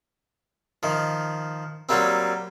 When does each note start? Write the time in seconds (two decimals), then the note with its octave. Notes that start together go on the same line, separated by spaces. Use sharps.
0.83 D#3 F3
1.89 F#3 G3 A#3 C4